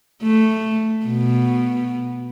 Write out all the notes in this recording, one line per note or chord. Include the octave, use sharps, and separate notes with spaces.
A3
B2